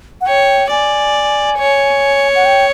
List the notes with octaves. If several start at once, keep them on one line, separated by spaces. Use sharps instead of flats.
F#5
C#5 G5
D5 G#5
C#5
F#5
G5